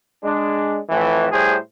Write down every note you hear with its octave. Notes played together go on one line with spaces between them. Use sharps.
G#3 D4
F2 A2 E3
A2 G3 G#4 C5